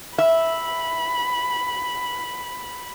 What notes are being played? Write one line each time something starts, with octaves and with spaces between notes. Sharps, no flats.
E5 B5